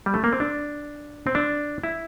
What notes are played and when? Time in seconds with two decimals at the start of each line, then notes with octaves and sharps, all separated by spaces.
0.06 G3
0.14 A3
0.24 A#3
0.33 C4
0.40 D4
1.27 C4
1.35 D4
1.84 E4